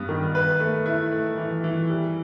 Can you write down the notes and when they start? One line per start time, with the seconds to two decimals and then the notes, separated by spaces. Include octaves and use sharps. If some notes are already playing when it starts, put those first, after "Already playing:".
Already playing: G2 B3
0.09 D#3
0.35 B4
0.60 A3
0.86 E4
1.12 A3
1.38 E3
1.64 E3
1.90 G3